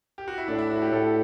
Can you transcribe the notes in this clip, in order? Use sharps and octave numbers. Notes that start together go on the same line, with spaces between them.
G4
F#4
E4
A2 D4
E4
F#4
G4
A2 A4